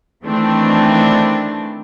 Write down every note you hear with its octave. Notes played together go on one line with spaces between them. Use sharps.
D#3 E3 A3 C4 D4